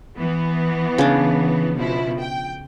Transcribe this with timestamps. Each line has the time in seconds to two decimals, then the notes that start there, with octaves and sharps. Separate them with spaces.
0.17 E3 B3
0.98 C#3 D4
1.75 B2 F3 E4
2.19 G5